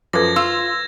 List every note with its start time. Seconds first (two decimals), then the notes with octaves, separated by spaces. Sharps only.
0.13 F#2 F3 A4 B4 D6 G#6 A#6
0.36 F4 C6 E6